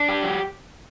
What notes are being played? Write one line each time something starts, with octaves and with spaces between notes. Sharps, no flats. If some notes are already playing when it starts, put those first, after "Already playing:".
Already playing: D4
G4
F#3